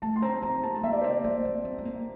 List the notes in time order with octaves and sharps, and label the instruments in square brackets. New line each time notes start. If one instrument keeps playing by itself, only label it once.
[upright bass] A3 [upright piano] A5
[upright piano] C6
[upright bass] C4 [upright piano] A#5
[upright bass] C4 [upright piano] A#5
[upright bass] A#3 [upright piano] A5
[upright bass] A3
[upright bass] A#3 [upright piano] E5
[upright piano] D5
[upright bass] C4 [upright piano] C5
[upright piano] D5
[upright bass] A#3
C4
C4
C4
A#3